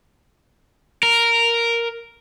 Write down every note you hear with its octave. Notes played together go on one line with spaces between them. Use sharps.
A#4